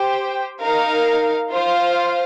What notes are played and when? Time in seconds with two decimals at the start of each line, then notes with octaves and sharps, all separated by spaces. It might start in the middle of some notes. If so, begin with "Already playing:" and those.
Already playing: G4 C5 G5
0.60 D#4 A#4 F5
1.50 F4 C5 F5